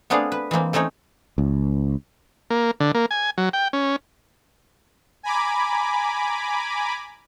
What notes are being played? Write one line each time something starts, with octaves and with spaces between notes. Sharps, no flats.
A3 B3 C4 D4 G#4 F5
B4
E3 G#3 A#3 C4
A3 C4 C#4 D#4 C#5
C#2
A#3
D3
A#3
G#5
F#3
G5
C#4
G#5 A#5 B5 D6